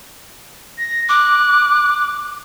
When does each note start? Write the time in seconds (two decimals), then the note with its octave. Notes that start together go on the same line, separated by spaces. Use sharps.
0.78 A#6
1.09 D6 F#6